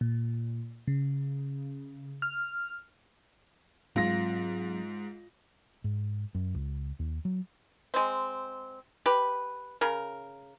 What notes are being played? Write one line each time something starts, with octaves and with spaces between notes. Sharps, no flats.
A#2
C#3
F6
G#2 F#3 C4 F4 A#6
G#2
F#2
C#2
D#2
F#3
G#3 C4
G4 B4
C#3 A#4